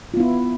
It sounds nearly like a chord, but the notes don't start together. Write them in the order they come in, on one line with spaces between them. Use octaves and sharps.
F4 B3 E4